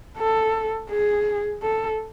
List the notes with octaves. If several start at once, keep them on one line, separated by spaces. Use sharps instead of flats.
A4
G#4
A4